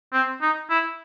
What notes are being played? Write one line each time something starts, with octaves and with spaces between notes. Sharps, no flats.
C4
D#4
E4